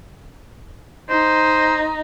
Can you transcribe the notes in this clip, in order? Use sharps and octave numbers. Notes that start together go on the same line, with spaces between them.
D#4 C5